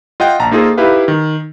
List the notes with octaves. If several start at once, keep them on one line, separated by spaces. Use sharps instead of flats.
F4 D#5 F#5 G5
A#1 A5 A#5
A#3 D#4 F4 G#4 A4 C5
D#4 E4 G4 B4 F5
D#3